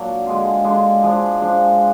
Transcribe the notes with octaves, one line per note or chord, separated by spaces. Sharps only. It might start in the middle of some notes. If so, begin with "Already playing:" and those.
Already playing: A#2 F#3 D4
D3 G#3 D4 F4
D3 G#3 D4 F4
F3 G#3 D4
F3 G#3 D4